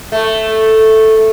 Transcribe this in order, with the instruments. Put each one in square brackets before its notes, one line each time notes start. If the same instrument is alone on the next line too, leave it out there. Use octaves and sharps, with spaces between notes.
[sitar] A3